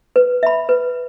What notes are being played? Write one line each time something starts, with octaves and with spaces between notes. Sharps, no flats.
B4
E5 B5
B4